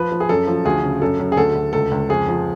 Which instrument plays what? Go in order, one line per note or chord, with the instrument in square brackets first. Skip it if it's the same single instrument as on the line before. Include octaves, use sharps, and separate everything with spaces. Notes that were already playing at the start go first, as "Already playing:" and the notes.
Already playing: [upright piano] F3 B4
F3
G#4
F#2 A4
F3
D2 G#4
C#3
F#2 A4
F#2
G#4
D2 A4
D2
C#2 A4
C#2
F2 G#4
F3